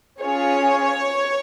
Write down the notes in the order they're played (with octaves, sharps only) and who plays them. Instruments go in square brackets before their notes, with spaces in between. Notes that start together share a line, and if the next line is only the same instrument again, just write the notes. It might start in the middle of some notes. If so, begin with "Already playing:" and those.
[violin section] C#4 F4 G#4 C#5